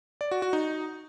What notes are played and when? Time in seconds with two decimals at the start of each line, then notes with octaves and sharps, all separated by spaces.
0.21 D5
0.31 F#4
0.42 F#4
0.53 D#4